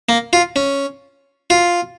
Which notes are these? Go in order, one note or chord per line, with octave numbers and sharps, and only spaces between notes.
A#3
F4
C#4
F4